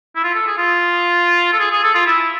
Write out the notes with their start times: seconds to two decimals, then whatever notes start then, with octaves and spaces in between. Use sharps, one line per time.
0.16 E4
0.24 F4
0.34 A4
0.47 G#4
0.58 F4
1.53 A4
1.59 G#4
1.71 G#4
1.83 A4
1.94 F4
2.06 E4